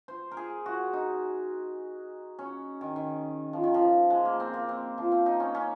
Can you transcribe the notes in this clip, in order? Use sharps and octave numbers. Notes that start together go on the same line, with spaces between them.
C5
A#4
G#4
F#4
D#4
C#4
D#3
D#3
F3
D#3
F3
G#3
A#3
C4
A#3
C4
F3
C4
D#4
C#4
C#4